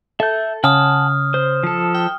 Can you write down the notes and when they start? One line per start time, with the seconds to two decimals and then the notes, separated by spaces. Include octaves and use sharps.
0.20 A4 E5 G6
0.64 C#3 F#5 G#5 A5 D#6 F6
1.34 C5
1.63 F3 A4
1.95 G5